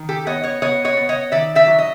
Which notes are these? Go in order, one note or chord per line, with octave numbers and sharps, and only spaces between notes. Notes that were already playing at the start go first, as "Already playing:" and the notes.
Already playing: D#3
G4 A4
B3 C#5 D#5
C#5 D#5
B3 C#5 D#5
C#5 D#5
B3
C#5 D#5
D#3 D5 E5
D5 E5
F#3
D#5